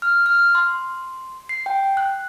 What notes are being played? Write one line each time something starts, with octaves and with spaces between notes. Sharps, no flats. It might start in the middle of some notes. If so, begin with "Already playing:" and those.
F6
F6
C6
C7
G5
F#6